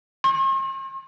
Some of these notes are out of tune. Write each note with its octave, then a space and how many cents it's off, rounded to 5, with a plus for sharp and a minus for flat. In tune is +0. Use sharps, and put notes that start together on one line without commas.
C6 +45